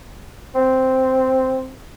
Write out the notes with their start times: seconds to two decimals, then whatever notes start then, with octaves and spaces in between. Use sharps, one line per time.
0.55 C4